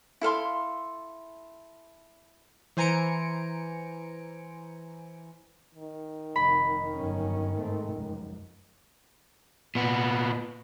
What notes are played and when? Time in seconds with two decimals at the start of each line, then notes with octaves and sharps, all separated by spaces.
0.21 E4 A4 F5 C6
2.77 E3 C5 G#5 A#5 C#7 D7
5.75 D#3
6.36 F1 B5
6.93 G1 F#2 C#4
7.57 G#2 A3 C4
7.89 F1 C#2 F#2
9.75 A#2 B3